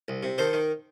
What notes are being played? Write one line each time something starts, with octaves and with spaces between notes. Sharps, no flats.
C2
C3
D#3 A4 C5
D#3